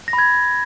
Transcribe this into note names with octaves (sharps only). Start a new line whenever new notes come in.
A#6
B5
G#6